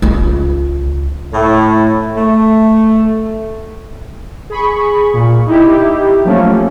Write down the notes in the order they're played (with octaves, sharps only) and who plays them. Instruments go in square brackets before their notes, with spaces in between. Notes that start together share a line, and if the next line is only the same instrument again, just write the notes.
[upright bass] C#2 F4
[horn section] A2
A3
[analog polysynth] G#4 B5 C#6
A#2
D#4 E4 G4
F3 F#3 A3 A#3 C#4